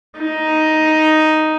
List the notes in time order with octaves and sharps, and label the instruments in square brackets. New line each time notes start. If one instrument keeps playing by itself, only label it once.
[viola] D#4